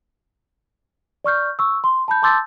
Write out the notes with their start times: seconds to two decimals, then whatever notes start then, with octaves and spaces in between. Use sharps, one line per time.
1.24 D5 C#6 F6 G6
1.59 C#6 E6
1.84 C6
2.08 A5 B5 G6
2.23 A5 C6 D6 E6 G6 A6